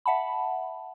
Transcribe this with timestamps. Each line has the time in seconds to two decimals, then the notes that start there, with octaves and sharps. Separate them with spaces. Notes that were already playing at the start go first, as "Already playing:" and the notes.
0.06 E5 F#5 A5 B5